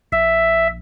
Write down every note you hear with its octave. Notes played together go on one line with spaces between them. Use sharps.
A#1 E5